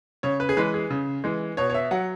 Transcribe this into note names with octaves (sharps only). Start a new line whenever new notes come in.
C#3 C#5
B4
G#4
E3 G#3 B4
G#4
C#3
E3 G#3
B2 C#5
C#5
E5
F#3 F#5